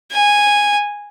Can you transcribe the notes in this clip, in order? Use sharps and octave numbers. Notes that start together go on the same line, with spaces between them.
G#5